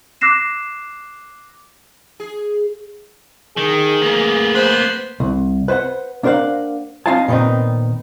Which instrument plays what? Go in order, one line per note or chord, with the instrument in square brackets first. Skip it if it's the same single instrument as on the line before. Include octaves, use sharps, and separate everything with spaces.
[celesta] D6 E6 F#6 A#6 C7 E7
[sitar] G#4
[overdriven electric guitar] D#3 [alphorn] G#4
[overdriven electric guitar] A#3 B3
[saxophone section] B4 C5
[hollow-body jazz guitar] C2
B4 C5 D5 F#5
A#3 D4 A#4 C5 F5 F#5
C4 D#4 F4 F5 G#5 A5
A#2 D#3 B3 C4 D#4